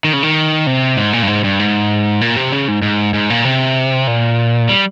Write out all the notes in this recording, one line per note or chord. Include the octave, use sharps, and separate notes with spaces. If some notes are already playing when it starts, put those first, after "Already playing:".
D#3
C#3
D#3
C3
G#2
A#2
G2
G#2
G2
G#2
A#2
C3
C#3
G#2
G#2
G#2
A#2
C3
A#2
G3